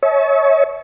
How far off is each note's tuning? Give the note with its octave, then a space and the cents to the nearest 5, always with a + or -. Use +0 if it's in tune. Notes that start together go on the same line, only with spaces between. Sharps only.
C#5 +0 E5 -45 A5 -45